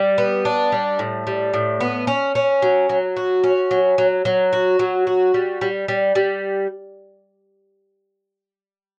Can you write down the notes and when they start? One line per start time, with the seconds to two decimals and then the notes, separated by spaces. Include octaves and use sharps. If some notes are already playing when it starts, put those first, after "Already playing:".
Already playing: G3
0.18 B3
0.45 D4
0.72 G3
0.99 A2
1.27 G3
1.54 A2
1.81 B3
2.07 C#4
2.35 C#4
2.62 F#3
2.89 F#3
3.17 F#4
3.44 C#4
3.71 F#3
3.98 F#3
4.25 F#3
4.53 F#4
4.79 F#3
5.07 F#4
5.34 G3
5.61 G3
5.88 G3
6.15 G3